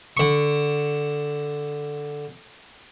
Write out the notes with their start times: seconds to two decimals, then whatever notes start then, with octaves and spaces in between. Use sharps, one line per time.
0.17 D3 C#6